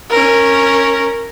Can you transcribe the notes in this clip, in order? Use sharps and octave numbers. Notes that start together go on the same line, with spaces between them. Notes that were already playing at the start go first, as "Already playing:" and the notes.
C#4 A#4